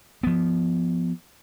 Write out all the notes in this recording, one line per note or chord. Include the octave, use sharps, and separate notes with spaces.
F3 B3